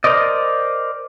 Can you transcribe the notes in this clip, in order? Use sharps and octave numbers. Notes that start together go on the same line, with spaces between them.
A#4 C5 D5 D#5